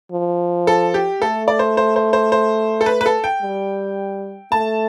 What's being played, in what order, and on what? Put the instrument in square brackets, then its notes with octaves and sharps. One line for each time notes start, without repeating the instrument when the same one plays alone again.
[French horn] F3
[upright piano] A4
G4
[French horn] A3 [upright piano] A4
[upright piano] D5
C5
C5
C5
C5
C5
A4
B4
B4
A4
G5
[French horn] G3
[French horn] A3 [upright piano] A5